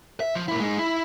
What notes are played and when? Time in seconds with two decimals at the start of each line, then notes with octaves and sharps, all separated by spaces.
0.20 E5
0.35 F3
0.48 A#2 E4
0.60 G#3 D#4
0.79 E4